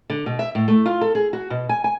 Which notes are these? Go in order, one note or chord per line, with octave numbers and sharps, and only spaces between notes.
D3
B2
E5
A2
A3
F4
A4
G#4
F#4
B2
G#5
G#5